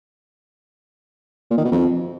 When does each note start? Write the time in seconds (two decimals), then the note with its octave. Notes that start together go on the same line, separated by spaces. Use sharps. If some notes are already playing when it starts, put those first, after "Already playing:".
1.50 A#2
1.58 D#3
1.65 B2
1.72 F2